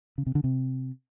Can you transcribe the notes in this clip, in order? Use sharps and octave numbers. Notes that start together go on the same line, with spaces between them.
C#3
C3
D3
C3